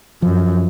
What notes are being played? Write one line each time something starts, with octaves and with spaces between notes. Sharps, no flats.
F#2 F3